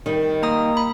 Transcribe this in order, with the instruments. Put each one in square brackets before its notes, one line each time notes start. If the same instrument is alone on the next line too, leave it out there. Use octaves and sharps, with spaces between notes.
[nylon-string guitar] D#3 G3
[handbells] A#3 A#5 D#6
B5